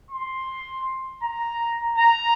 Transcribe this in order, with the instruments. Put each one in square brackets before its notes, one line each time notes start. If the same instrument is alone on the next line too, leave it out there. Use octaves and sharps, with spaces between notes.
[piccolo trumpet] C6
A#5
A#5